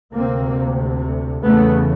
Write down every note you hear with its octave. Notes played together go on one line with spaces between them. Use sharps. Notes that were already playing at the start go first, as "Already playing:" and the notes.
D2 C3 A#3 C4
E2 C#3 A3 B3